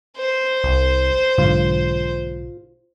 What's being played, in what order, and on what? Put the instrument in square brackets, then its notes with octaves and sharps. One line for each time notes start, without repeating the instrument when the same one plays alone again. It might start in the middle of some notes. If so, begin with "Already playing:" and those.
[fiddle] C5
[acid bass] C2
[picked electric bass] B1 G#2 D3 [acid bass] F4